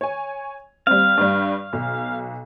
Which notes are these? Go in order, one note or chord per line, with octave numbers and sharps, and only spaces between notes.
C#5 G#5
G3 C4 F5
G2 G3
B1